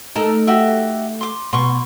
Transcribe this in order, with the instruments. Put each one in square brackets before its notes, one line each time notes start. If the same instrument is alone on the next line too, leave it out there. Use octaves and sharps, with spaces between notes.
[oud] A3 D#4 A4 [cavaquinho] A#4
[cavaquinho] F#4 G4 E5
C6 D6
[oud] B2 [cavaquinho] C6 C#6